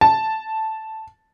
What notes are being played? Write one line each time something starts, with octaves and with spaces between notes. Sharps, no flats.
A5